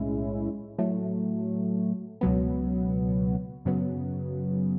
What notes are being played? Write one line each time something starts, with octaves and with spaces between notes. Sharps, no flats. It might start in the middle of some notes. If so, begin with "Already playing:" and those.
Already playing: B1 A2 G#3 C#4 E4
A2 F#3 A3
C#2 B2 F#3 B3
F#2 C#3 F#3 B3